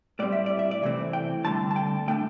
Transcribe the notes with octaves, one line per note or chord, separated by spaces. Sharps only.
A2 G3 C4 D5
E5
D5
E5
D5
C3 E3 A3 C4
G5
G2 D3 A3 C4 A5
A5
G5
A2 A3 D4 G5